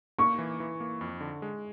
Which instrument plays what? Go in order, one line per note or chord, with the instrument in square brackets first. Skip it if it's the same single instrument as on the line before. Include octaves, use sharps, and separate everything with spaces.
[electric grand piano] A#3 [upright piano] C#6
[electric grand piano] E3
E3
A#3
F2
D3
G#3